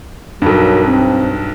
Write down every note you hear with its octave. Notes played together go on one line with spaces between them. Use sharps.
B1 G2 F#3 A#4
C4